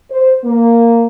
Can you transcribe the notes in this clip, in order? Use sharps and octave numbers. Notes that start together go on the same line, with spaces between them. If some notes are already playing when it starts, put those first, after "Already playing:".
C5
A#3